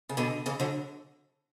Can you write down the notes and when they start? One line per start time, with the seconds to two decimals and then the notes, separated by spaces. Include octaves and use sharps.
0.09 C#3
0.17 B2 D3
0.46 C#3 E3
0.60 D3 F#3